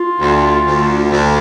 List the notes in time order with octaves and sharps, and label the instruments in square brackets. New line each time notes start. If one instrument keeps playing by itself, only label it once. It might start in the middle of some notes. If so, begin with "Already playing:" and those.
Already playing: [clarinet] F4
[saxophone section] D2
D2
D2